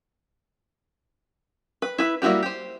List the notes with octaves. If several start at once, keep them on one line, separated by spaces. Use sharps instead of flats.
B4
E4 B4
G3 A#3 E4 F#4 G4
G4 C5